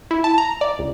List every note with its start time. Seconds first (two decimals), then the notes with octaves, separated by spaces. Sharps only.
0.11 E4
0.24 A5
0.38 A#5
0.61 D5
0.79 C#2